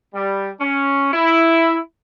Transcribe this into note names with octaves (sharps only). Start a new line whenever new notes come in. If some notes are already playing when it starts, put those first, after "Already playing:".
G3
C#4
E4